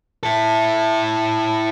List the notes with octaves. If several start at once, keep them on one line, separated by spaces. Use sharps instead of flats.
E4 A4